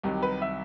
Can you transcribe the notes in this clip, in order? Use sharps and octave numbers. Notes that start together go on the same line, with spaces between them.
C2 C3 D#3 F#3 G4
B4
E5